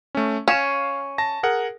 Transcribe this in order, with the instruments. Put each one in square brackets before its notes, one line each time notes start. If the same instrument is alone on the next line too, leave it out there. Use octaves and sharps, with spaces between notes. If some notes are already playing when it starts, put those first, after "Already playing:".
[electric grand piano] A3 C#4
[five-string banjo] C#4 [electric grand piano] F5 E7
[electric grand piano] A5 A#6
G#4 A#4 F#5